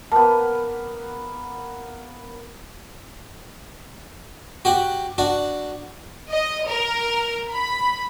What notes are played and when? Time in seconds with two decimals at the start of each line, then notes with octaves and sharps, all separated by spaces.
0.12 A#3 B3 A5
4.65 F#4 G4 F#5
5.18 D4 F#4
6.30 D#5
6.66 A#4
7.52 B5